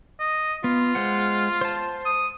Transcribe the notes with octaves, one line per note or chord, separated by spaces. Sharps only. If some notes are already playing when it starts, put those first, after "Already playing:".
D#5
B3 F4
G#3 C5 F#5
C5 A5
D#6